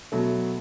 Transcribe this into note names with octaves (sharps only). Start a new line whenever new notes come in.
B2 F#3 A3